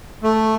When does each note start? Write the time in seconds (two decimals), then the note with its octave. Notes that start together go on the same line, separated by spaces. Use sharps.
0.23 A3